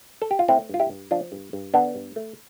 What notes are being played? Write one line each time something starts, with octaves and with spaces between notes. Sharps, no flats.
A4
G4
F4
A3 C4 E4
G2 F4
E4 G4
G2
F3 D4 F4
G2
G2
D3 B3 D4
G2
A3